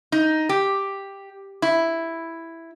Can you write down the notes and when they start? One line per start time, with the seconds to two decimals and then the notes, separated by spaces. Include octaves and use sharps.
0.12 D#4
0.49 G4
1.62 E4